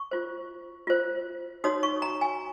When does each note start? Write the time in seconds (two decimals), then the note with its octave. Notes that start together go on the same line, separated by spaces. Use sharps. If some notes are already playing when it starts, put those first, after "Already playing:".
Already playing: C#6
0.11 F4 C5
0.87 F4 C5
1.64 D#4 F#4 C#5 D#6
1.83 C#6
2.02 A#5
2.21 G#5